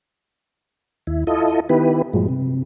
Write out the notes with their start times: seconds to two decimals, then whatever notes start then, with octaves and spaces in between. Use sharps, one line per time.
1.07 D#2 E4
1.27 E4 F4 A4 D#5
1.69 D#3 B3 E4 G4 B4
2.13 G2 A#2 F3 F#3 G#3
2.28 C3